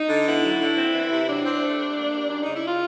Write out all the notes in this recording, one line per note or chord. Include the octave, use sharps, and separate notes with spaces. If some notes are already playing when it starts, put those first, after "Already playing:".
Already playing: D#4
D3
B3 E4
F#3
D3
C4
E3
C3
F#3 D4
C4
A3
G3
A#3
G3
F#2 D4
C#3 D#4
E4
F4